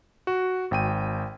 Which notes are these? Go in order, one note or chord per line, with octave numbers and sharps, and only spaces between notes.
F#4
G#1 G5 D#7